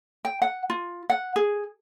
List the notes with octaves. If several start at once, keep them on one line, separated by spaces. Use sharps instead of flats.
G5
F#5
F4
F#5
G#4